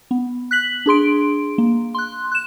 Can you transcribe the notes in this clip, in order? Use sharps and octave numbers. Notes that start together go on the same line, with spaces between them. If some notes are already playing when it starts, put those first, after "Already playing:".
B3
F#6 B6 F#7
D4 G#4 C6 D7
A#3
C6 F#6
F#6 E7